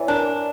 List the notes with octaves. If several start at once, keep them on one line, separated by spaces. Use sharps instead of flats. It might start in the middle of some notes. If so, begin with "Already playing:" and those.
Already playing: E3 C#5 D5 E5
D4 A#4